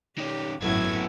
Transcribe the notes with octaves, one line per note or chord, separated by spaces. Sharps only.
D#3 C#4 G4
G#1 F#2 A2 F#3 B3 E4 A4 G#6